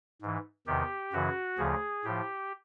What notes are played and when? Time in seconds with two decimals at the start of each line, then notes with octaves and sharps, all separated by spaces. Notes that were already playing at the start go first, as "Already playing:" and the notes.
0.22 G#2 E3
0.67 E2 C3 D#3 G4
1.13 F#2 C#3 E3 F#4
1.58 D2 C#3 F3 G#4
2.04 A2 F3 G4